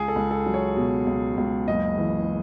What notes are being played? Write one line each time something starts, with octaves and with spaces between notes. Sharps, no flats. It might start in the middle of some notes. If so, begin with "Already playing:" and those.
Already playing: C#2 G#4
A4
C#2
A4
F#3
C#5
B2
C#2
C#2
F#1 D#5
E3